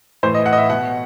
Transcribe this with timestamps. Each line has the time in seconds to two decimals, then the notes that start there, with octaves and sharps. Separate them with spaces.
0.23 A2 E3 C5
0.34 D#5
0.46 F#5
0.53 D#5
0.58 E5
0.70 B2 F#5